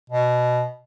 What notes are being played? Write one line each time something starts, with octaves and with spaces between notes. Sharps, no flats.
B2